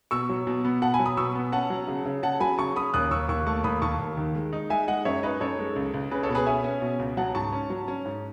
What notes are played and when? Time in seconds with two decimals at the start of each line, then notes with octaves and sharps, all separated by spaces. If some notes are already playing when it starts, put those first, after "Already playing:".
0.11 B2 C#6 E6
0.29 F#3
0.47 B2
0.65 B3
0.82 B2 F#5 A5
0.94 G#5 B5
1.00 F#3
1.06 B5 D#6
1.17 B2 C#6 E6
1.35 B3
1.52 C#4 F#5 A5
1.70 F#3
1.88 C#3
2.06 C#3
2.23 C#3 F#5 A5
2.40 F#3 G#5 B5
2.58 C#3 A5 C#6
2.76 C#4 B5 D#6
2.94 D#2 D#6 F#6
3.11 D#2 C#6 E6
3.29 D#2 C#6 E6
3.46 A3 A5 C#6
3.64 D#2 B5 D#6
3.82 D#2 A5 C#6
3.99 D#2
4.17 D#3
4.35 G#3
4.53 D#4
4.70 G#3 E5 G#5
4.88 G#3 D#5 F#5
5.05 F#2 C#5 E5
5.23 D#4 B4 D#5
5.40 F#2 A4 C#5
5.59 G#3
5.76 C#2
5.94 C#2
6.11 C#4 G#4 B4
6.23 A4 C#5
6.29 B2
6.35 G#4 B4
6.46 C#4 E5 G#5
6.64 C#4
6.82 B2
6.99 C#2
7.17 F#3 F#5 A5
7.35 G#2 A5 C#6
7.53 C#4
7.70 F#3
7.88 C#4
8.05 G#2